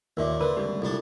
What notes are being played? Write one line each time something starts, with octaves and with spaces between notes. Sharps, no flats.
D#2 A#2 A#4 E5 D6
D3 A#4 B4 C6
C#2 G2 G4
C2 D4 F4 A4